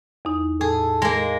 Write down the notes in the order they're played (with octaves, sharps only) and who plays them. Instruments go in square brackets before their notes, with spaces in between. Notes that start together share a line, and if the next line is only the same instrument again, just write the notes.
[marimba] E2 D#4
[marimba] A2 [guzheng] G#4 [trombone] A4
[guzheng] G#3 A#3